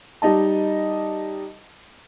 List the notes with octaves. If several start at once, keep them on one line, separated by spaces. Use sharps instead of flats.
G3 D#4 D#5 A5